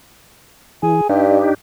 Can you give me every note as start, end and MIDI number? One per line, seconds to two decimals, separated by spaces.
0.83 1.01 52
0.83 1.06 68
1.09 1.47 43
1.09 1.54 62
1.09 1.54 63
1.09 1.54 67